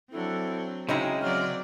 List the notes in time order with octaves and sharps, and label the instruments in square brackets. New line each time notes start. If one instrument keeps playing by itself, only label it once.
[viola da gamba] F#3 C4 [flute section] D4 E4 A4
[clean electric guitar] C#3 G#3 [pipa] D#4 E4 A#5 [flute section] F#4 G5
[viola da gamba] F#3 C4 D5 [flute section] F6